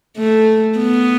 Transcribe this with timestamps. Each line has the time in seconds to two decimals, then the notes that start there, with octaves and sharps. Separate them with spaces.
0.17 A3
0.78 B3